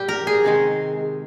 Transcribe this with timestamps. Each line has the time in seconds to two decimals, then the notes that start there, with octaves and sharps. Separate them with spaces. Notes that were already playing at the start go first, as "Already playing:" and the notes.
Already playing: A#2 G3 G4
0.08 A#4
0.27 G#4
0.44 C3 D#3 G#3